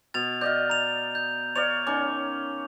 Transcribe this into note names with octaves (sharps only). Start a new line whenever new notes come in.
B2 A6 F7
D5 D#5 F5 G6
A#5 F7
G6
C#5 D5 F5 F7
D#3 C#4 D6